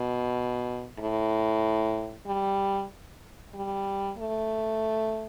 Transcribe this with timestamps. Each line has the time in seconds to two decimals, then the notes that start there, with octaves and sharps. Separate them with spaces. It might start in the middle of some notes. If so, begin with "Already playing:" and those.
Already playing: B2
0.99 A2
2.26 G3
3.54 G3
4.18 A3